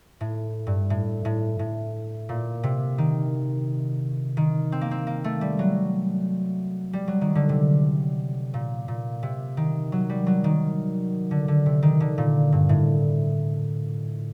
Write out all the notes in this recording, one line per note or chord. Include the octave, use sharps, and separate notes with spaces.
A2
G2
A2
A2
A2
A#2
C3
D#3
D#3
C4
A#3
C4
A#3
A3
G3
F#3
G3
F#3
D#3
D3
C3
A#2
A#2
C3
D#3
F#3
G3
F#3
D#3
D3
D3
C3
D#3
D3
A#2
G2
A2